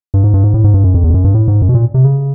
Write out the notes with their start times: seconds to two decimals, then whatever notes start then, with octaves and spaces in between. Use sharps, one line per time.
0.14 G2
0.24 G#2
0.34 G2
0.44 G#2
0.54 A2
0.64 G#2
0.74 G2
0.84 F#2
0.94 F2
1.04 E2
1.10 F2
1.14 F#2
1.24 G2
1.34 A2
1.48 G#2
1.62 F#2
1.69 B2
1.74 A#2
1.94 C3
2.04 C#3